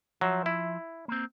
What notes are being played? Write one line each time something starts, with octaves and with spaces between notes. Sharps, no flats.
F3 F#3 E5
E4
A#3 C4